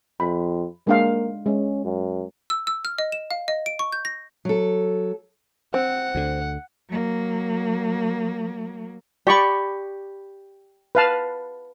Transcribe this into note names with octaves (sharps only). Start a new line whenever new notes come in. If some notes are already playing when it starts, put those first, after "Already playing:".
F2 B5
G#3 A#3 D4 F5
G#3 C#4
F#2
E6
E6
F6
D#5
E7
F5
D#5
D7
C#6
G6
A#6
F#3 A4
C4 F#5
D2 D3
F#3 A#3
G4 D5 B5 C#6
B4 F5 A5